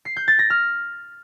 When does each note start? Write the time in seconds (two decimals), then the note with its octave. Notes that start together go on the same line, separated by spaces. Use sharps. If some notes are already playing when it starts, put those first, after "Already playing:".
0.05 C7
0.16 G6
0.28 A6
0.39 A#6
0.50 F6